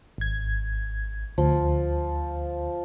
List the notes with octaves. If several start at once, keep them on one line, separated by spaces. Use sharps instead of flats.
G#1 G#6
D2 F3